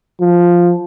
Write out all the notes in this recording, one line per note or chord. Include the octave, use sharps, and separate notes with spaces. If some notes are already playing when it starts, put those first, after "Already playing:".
F3